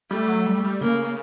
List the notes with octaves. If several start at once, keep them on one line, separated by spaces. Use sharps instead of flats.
G3 A3
F#3
G3
G3
C#3 A#3